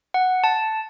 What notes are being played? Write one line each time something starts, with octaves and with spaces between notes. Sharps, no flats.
F#5
A5